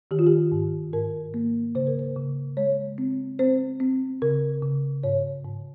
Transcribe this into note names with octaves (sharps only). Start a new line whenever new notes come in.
D#3 G4
F4
G4
G#2
G#2 A#4
A#3
C#3 C5
A#4
C5
C#3
G#3 C#5
C4
C4 C5
C4
C#3 A#4
C#3
G#2 C#5
G#2